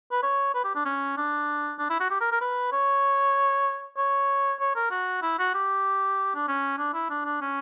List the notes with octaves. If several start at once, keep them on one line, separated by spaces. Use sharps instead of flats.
B4
C#5
B4
G4
D4
C#4
D4
D4
E4
F#4
G4
A#4
A#4
B4
C#5
C#5
C#5
A#4
F#4
E4
F#4
G4
D4
C#4
D4
E4
D4
D4
C#4